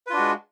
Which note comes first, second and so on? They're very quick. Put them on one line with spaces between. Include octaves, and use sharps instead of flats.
B4 F4 D4 F#4 G#3